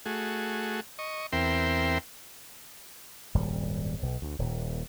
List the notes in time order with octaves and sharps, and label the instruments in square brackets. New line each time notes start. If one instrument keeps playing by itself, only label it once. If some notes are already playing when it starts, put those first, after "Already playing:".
[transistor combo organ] A3 F#4 G#4
D#5 C#6
E2 C4 A#4 E5 G5 C6
[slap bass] D#1 G#1 F#2 G3
B1
D2
D#1 A#2